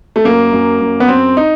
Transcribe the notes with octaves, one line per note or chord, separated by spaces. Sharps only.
A3
F#2 A#3
F#2
F#2
B3
F#2 C4
D#4